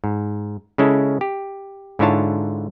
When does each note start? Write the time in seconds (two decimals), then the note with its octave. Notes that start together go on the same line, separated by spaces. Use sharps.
0.04 G#2
0.78 C#3 G#3 C#4 E4 A4
1.21 G4
1.99 G#2 D3 E4 F4 C#5 A5